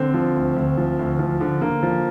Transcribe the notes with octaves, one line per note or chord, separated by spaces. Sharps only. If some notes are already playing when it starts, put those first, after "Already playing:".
Already playing: D3 C4
F3
D2
D2
F3
D2
F3
D3
D3 A#3
F3